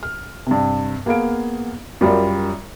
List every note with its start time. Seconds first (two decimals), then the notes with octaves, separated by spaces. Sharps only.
0.03 F6
0.47 G2 C3
1.06 A#3 B3 G#4 F5 D7
2.01 F#2 G3 F4 A#4 D5